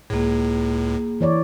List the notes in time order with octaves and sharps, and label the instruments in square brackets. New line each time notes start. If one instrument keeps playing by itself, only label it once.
[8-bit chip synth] C#2 A2 [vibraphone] A#3 G#4
[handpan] E3 C#5 D5